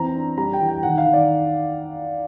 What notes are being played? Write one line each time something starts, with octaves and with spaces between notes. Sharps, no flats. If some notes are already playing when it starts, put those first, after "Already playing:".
Already playing: E3 C4 A#5
D4
G3 A#5
G5
E3
G5
D#3 F#5
F5
D#3
D5